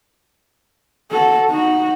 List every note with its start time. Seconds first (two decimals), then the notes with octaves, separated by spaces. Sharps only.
1.11 F#4 A4
1.49 D#4 F#4